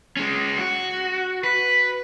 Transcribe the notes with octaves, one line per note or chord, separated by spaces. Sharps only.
G#3 C#4
F#4
B4